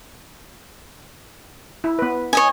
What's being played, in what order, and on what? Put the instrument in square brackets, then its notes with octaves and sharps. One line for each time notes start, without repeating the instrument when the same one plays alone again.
[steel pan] E4
B3 B4
[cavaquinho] C#5 D#5 G#5